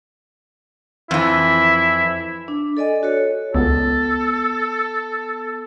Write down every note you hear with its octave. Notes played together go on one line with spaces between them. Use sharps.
F2 E3 E4
D4
A4 D5 D#5 G#5
F#4 A4 C#5
C#2 B3 A4